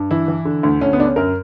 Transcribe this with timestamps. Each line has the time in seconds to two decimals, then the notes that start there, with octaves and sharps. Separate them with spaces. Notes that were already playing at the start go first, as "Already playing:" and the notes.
Already playing: G2
0.11 E3 E4
0.28 E3
0.45 D3
0.63 D2
0.81 D2 C#4
0.93 B3
0.99 D3 D4
1.05 C#4
1.16 F#2 A#4